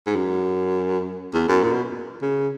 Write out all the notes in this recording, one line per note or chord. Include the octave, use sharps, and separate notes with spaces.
G#2
F#2
E2
F#2
A#2
B2
C#3